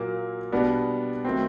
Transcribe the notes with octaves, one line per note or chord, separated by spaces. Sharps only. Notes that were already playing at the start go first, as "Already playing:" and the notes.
Already playing: A#2 F#3 A#3
B2 G3 B3 D4
D#3 F#3 A3 C4